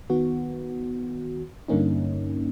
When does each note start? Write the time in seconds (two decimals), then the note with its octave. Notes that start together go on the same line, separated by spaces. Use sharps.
0.10 D#3 B3 F#4
1.68 G2 D3 A#3 C#4 D#4